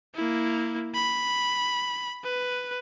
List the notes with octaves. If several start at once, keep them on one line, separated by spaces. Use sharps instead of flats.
A#3 E4
B5
B4